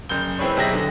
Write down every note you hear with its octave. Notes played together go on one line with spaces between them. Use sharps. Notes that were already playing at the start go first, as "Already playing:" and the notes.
F#1 G6 G7
C4 E4 G#4 B4 C#5
B1 G4 G#4 E5 A#6
D3